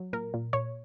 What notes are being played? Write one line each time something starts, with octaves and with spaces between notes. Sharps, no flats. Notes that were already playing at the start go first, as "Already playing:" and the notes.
Already playing: F#3
A#2 A#4
A#2
A#2 C#5